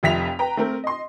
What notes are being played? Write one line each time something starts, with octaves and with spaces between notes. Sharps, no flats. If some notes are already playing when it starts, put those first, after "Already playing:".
F1 F2 E5 B6 F7
B4 G5 A#5
A3 C4 A#4
D#5 C6